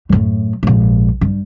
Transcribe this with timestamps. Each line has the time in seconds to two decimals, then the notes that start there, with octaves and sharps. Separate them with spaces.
0.09 F#2 A2
0.63 A#1 G#2
1.21 G2